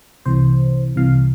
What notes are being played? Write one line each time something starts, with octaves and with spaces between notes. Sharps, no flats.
C2 C3 E3 C5
C2 C3 E3 F5